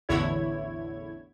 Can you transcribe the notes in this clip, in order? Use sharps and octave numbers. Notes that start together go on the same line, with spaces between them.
A1 E2 D3 E4 C#5 G#6